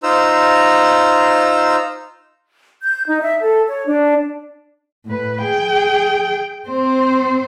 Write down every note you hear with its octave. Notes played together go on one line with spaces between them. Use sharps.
D#4 F4 C5 A#5 E6
G6
D#4
E5
A4
C#5
D4
A2 B4
G#4 G5
C4 C5